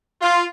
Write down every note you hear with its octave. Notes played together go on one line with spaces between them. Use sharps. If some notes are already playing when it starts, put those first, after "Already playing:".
F4